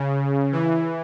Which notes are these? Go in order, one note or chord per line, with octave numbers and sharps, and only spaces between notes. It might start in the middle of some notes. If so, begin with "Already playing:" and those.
Already playing: C#3
E3